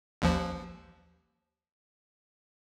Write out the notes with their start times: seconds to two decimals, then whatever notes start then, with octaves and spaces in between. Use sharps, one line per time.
0.22 A1 D#2 F3